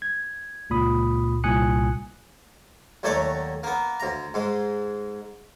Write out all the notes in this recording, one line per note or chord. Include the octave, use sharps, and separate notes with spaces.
G#6
C#2 A#2 B5 D#6
C2 A#2 G#5 D#6 F#6 C#7
D#2 F#3 A3 C#5 D5 D6
A#3 B3
D2 A#5
G#2 G#3